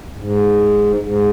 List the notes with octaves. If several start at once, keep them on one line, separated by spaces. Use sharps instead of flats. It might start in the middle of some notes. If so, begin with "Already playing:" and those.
G#2
G#2